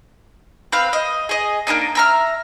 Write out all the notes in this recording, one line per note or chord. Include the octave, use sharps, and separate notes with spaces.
C4 B4 F5
D#5
G#4 D#5
A#3 C4 D4 D#4
E5 A#5 F6